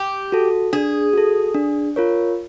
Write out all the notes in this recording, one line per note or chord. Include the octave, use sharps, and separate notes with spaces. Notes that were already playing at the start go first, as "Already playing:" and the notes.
Already playing: G4
F#4 A4
D4 G#4
F#4 A4
D4
F4 A#4 C#5